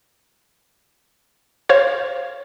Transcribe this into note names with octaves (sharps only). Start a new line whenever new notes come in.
C5 C#5 F5